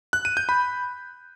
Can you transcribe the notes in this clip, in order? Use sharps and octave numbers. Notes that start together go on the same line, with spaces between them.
F#6
D#7
G6
B5